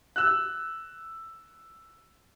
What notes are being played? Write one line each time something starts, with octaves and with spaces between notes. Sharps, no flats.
E6 F#6